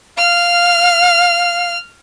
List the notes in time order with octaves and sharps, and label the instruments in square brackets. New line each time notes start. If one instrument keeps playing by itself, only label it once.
[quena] F5 [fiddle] F6